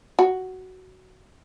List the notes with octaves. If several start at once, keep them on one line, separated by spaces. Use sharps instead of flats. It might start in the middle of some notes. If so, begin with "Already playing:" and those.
F#4